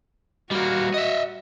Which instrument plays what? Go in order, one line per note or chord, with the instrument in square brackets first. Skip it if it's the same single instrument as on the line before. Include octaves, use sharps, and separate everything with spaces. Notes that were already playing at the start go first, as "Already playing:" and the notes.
[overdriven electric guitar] G3 A#3 [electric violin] F#4
[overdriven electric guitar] D#5 E5